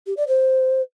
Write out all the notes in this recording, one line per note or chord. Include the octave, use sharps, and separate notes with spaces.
G4
D5
C5